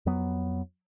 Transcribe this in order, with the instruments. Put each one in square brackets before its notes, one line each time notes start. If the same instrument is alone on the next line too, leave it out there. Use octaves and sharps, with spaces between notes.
[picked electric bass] F2 F#3 B3